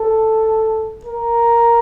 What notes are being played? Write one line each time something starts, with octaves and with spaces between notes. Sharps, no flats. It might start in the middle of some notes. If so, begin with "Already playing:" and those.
Already playing: A4
A#4